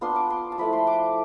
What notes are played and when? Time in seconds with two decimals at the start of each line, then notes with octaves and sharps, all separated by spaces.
0.01 B3 D4 F4 C6
0.16 D6
0.30 C6
0.52 A5
0.58 F3 A3 E4 B5
0.73 C6
0.87 D6